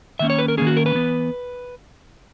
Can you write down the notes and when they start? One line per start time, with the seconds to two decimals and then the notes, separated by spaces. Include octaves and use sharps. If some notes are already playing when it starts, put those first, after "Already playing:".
0.19 D#3 A#3 C#4 E5
0.30 C#5
0.39 B4
0.48 A#4
0.57 D#3 A#3 C#4 G#4
0.67 F#4
0.77 A#4
0.86 B4
0.95 E3 B3